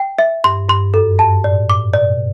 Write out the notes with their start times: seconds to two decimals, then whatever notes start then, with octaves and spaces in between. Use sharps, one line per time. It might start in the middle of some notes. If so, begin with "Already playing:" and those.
Already playing: G5
0.19 E5
0.44 G2 C6
0.68 G2 C6
0.94 F#2 A4
1.19 G2 A5
1.44 A2 D5
1.70 D6
1.94 B2 D5